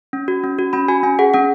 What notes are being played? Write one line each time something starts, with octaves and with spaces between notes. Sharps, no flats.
C#4
F#4
C#4
F#4
C#4 B5
F#4 G#5
C#4 G#5
G#4 F#5
C#4 F#5